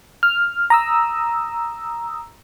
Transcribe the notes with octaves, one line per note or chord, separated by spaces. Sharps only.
F6
A#5 D#6 E6